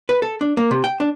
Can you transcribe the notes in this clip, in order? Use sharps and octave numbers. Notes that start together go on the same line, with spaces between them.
B4
A4
D4
A#3
C3
G5
D4